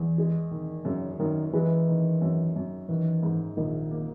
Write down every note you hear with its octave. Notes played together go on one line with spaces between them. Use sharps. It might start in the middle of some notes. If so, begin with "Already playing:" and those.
Already playing: E2 E3
G#3
D#3
F#2 C#3
F#2 D#3
E3 G#3
D#3
F#2
F#2
D#3 E3
G#2
A#1 D#3
A#3